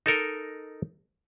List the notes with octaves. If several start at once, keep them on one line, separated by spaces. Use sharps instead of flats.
D#4 A4 A#4 D#5